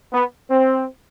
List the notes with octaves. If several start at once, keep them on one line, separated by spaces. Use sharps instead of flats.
B3
C4